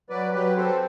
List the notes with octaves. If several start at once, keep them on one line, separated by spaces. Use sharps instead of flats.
F#3 B4 D5
F#3 G4 B4
C4 A4 C5